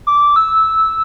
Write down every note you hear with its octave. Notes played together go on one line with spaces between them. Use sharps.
D6
E6